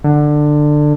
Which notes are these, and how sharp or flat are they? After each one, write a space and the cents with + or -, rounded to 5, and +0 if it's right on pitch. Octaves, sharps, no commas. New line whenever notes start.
D3 +15